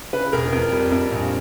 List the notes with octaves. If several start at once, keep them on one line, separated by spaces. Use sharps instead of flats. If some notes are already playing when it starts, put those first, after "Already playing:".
C#3 B4
E1 A#4
F2
G3
F2
A#1